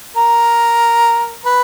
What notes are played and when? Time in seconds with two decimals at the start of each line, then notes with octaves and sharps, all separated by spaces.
0.17 A#4
1.46 B4